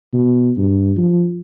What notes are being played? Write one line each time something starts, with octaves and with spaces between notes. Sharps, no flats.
B2
G2
F3